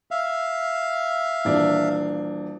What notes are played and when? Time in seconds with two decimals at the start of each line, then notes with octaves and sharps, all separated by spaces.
0.11 E5 F5
1.45 D#1 E3 D4